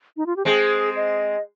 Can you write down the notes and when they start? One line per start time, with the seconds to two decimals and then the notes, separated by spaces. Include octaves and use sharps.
0.17 D#4
0.26 F4
0.36 G4
0.45 G#3 C4 G#4
0.96 D#5